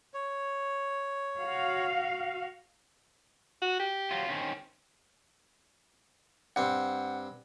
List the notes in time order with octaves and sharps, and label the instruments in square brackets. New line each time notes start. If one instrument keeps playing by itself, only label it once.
[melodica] C#5
[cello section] F#4 F5
[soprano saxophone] F#4
G4
[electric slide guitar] F#3 F4
D#3 C4 C#4
[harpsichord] G2 C4 [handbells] F#5